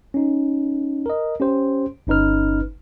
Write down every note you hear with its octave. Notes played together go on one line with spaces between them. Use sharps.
C#4 D#4
A#4 D#5
C#4 G4 C5
G1 C#4 D#4 B4 F6